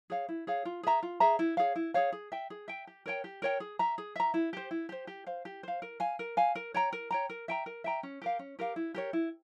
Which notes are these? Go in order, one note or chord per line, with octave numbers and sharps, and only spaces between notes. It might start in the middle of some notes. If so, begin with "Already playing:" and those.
G#4 C#5 F5
E4
G#4 C#5 F5
F4
G#4 E5 A#5
F4
G#4 E5 A#5
E4
G#4 C#5 F5
E4
G#4 C#5 F5
G#4
E5 G5
G#4
E5 G5
G4
A#4 C#5 G5
G4
A#4 C#5 G5
G#4
E5 A#5
G#4
E5 A#5
E4
G4 C5
E4
G4 C5
G4
C5 F5
G4
C5 F5
A#4
F5 G#5
A#4
F5 G#5
A#4
C#5 G5 A#5
A#4
C#5 G5 A#5
A#4
E5 G5 A#5
A#4
E5 G5 A#5
C#4
G4 A#4 F5
C#4
G4 A#4 F5
E4
G4 A#4 C#5
E4